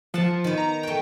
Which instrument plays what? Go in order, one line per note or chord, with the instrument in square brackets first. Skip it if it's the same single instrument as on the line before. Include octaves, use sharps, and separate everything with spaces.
[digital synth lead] F3 [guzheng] F#5 A5
[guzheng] D#3 B3
[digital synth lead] A#5
[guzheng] A3 F#4 [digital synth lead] G5